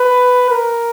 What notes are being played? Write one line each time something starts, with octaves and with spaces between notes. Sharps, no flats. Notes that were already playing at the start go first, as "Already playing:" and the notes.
Already playing: B4
A#4